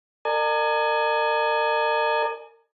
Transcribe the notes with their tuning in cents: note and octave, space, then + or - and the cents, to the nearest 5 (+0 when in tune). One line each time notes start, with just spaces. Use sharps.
A#4 -30 D5 +45 G#5 +20